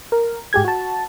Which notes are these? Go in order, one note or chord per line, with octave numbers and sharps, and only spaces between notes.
A#4
G#2 G4 G#4 G#6
F#4 A5